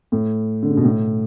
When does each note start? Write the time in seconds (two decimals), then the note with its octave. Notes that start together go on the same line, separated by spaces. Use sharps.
0.12 A2
0.63 D3
0.70 C#3
0.77 B2
0.84 A2